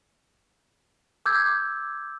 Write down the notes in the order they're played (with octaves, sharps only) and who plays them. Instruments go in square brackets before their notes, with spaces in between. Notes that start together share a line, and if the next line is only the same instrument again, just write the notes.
[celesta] D6 E6 G6 G#6